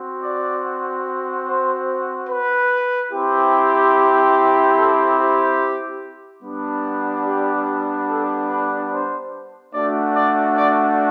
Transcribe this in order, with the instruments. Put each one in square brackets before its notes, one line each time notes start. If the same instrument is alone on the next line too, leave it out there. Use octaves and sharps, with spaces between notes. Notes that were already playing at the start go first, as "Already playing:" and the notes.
Already playing: [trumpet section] C4 F#4
D5
C5
B4
C4 E4 G4
A4
G4
G3 B3 D4
G4
A4
B4
C5
A3 D4 F#4 D5
D5
D5